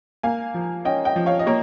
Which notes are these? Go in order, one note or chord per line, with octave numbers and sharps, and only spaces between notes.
A#3 F5 G#5
F3
C#4 D#5 G5
D#5 G5
F3
C#5 F5
D#5
A#3 A#4 C#5